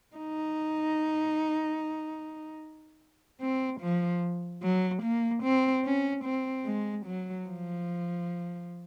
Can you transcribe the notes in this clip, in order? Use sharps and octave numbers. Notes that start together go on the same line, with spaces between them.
D#4
C4
F3
F#3
A#3
C4
C#4
C4
G#3
F#3
F3